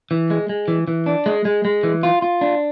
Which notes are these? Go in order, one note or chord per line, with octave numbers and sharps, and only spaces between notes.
E3
G#3
G#3
E3
E3
D4
G#3
G#3
G#3
E3
F4
F4
D4